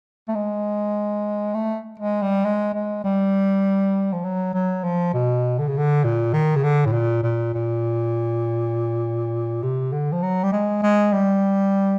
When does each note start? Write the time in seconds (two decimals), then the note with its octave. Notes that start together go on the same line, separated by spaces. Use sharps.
0.28 A3
0.35 G#3
1.54 A3
1.99 G#3
2.22 G3
2.45 G#3
2.74 G#3
3.04 G3
4.12 F3
4.24 F#3
4.54 F#3
4.83 F3
5.14 B2
5.59 D3
5.68 C#3
5.77 D3
6.04 A#2
6.33 D#3
6.56 C#3
6.63 D3
6.86 A2
6.93 A#2
7.23 A#2
7.54 A#2
9.63 C3
9.92 D3
10.12 F3
10.23 F#3
10.43 G3
10.52 G#3
10.83 G#3
11.13 G3